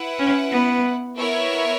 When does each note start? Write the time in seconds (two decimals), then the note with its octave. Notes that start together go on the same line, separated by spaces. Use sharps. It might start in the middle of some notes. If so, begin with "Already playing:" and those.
Already playing: E4 B4 F#5
0.19 C#4
0.52 B3
1.17 B3 E4 A#4 C#5 E5